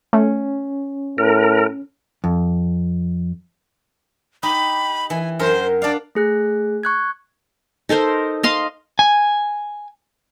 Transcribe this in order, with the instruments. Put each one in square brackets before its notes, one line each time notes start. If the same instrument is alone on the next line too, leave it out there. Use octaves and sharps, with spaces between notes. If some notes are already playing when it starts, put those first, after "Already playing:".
[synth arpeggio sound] A3 [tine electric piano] C#4
[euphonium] A2 [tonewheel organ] A#4
[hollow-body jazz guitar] F2
[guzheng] D#4 G4 [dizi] B5
[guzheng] E3 [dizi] G#5
[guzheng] F#2 A#4 C6 [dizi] C5
[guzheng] D4 F5 [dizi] D5
[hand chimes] A3 G#4 F#6
C#6 F#6 G#6
[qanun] D#4 A4 A#4 C5
D#5 F5 C6
[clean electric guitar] G#5